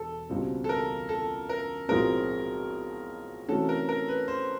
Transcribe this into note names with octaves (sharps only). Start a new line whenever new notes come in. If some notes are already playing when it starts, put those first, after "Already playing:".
Already playing: E1 A4
C#2 B2 G3 C4
A4
A#4
A4
A#4
B1 A2 F3 G#3 C4 A#4
C3 E3 A3 C#4 F#4 A4
A#4
A#4
B4
C5